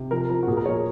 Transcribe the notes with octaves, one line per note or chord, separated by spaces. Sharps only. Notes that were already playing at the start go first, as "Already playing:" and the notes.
Already playing: C3
F3 A#4
F3 A#4
F#4
A#2 G#4
A#4
F3 C#5
G#4